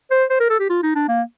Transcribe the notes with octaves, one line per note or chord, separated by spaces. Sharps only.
C5
C5
A#4
A4
G4
F4
D#4
D4
A#3